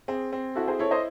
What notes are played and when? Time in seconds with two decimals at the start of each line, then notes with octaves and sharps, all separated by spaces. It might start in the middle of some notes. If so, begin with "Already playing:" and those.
0.08 C4 G#4
0.33 C4
0.55 E4 F#4 A4
0.68 G#4 C5
0.79 E4 A4 C#5
0.91 C5 D#5